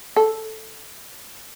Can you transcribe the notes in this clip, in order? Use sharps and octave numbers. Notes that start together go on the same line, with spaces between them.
A4